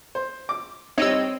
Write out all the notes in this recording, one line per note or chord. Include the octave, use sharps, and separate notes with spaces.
C5
D6
G3 C4 D#4 C#5 D#5 E6